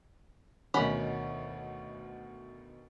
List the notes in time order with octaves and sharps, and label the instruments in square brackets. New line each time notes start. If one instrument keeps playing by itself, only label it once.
[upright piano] D2 B2 D#3 [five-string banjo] C#4 F#5 B5